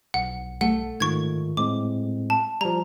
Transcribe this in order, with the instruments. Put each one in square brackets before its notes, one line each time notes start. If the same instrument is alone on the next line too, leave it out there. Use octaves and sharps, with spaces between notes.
[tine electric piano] B1 [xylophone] F#5
[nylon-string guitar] A3 [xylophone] F#5
[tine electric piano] G#2 D#3 F4 [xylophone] C#6 G#6
[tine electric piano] A2 G#3 C4 [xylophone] D6
[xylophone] A5
[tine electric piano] F3 G3 [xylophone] A#5